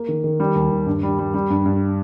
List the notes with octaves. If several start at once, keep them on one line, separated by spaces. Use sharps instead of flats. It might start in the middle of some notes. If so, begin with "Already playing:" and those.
Already playing: A#3
D#3
D#3
G3
D#2
D#2
G2
G3
G3
G3
G2
G2